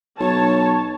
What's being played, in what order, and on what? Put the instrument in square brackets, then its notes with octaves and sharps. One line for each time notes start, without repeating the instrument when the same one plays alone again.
[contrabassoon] B1 [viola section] C#5 A5